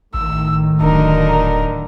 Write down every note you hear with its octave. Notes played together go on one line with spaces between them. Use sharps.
G#1 A2 D#3 E6
D#1 D3 F#3 D#4 A#4